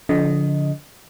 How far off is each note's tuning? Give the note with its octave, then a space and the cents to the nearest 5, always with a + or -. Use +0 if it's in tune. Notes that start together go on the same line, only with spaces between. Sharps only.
D3 -35 F3 +5 D#5 +0